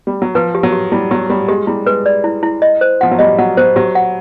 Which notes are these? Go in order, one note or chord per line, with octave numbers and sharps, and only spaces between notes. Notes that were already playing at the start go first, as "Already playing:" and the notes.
G3
F#3
F3 B4
G4
F#3
G4
G3 E4
F#3 G4
G3 G4
G#3 G4
G3 E4
G#3 B4
D5
E4
E4
D#5
C5
F3 F#5
F#3
G3 D#5
F#3 F#5
F#3 C5
F#3 G4
F#5